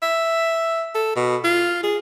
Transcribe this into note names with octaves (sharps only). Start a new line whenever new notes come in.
E5
A4
B2
F4
G#4